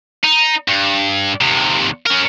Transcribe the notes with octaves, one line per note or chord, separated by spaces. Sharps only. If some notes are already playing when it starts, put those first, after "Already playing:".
D#4
G2
D#2 C3
C#4 A#4